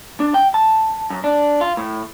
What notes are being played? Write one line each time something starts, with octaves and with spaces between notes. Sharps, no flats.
D4
G5
A5
F#2
D4
F4
A2